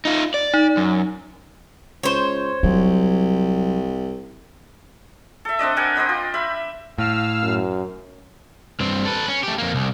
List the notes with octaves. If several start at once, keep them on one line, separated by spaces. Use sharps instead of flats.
D#4 F4
D5
D#4
F#2
C#2 C5 C#5
C2 F#3
A4 E5
C4 D4 D5 D#5
G4 A#4 F#5 G#5
G4 C5 D#5 B5
F4
E5 B5
A2 F5 E6 F6
F#2
G2 C4
A4 B4
C#4
A3 G4
F2 A#3
C2